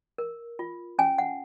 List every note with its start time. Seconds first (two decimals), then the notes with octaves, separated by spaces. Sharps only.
0.18 A#4
0.59 F4
0.99 C#4 G#5
1.18 F#5